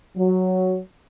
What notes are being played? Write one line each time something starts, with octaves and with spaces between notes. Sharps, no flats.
F#3